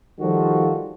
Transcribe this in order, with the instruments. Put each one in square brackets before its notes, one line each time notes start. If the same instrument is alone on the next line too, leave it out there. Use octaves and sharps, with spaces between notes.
[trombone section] D#3 F3 G3 F4 F#4 A4